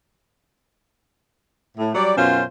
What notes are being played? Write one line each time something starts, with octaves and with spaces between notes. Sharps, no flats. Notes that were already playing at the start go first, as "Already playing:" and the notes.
A2
F#3 G3 D5
F#2 B2 C#4 F4 C5